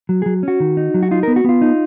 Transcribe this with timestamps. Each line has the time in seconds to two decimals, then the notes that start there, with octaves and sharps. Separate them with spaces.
0.09 F#3
0.22 F#3 G#4
0.43 C#4 F#4
0.60 D#3
0.77 D#4
0.94 F#3
1.03 F#4
1.11 D#4 F4
1.23 B3 A#4
1.36 F#4
1.44 B3 F4
1.62 D#4